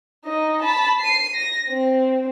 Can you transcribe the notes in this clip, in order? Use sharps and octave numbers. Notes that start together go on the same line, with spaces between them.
D#4 D#5
A5 B5
C7 D#7
A#6
C4